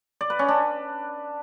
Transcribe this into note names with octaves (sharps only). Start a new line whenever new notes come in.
D5
B4
C#4
D4